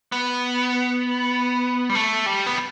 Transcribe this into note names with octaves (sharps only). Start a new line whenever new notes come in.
B3
G3
A3
G3
B3